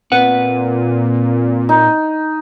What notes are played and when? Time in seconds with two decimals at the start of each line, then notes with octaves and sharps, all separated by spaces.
0.12 A#2 C4 B4 F#5
1.69 D#4